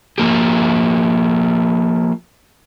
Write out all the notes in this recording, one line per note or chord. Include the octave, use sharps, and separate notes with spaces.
F3 A#3 G4